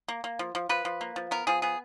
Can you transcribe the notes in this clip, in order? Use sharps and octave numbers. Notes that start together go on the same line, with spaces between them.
A#3
A#3
F3
F3
F3 B4
F3
A#3
F3
B3 A#4
F3 G#4
B3 G#4